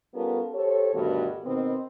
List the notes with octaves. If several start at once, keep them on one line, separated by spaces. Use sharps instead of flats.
G3 B3 C#4 F4 A4 A#4
G4 A4 C5 C#5
D2 G2 B2 D#3 B3 F#4
B2 D#3 B3 C4